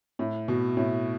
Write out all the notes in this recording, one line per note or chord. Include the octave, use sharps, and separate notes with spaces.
A2
B2
A2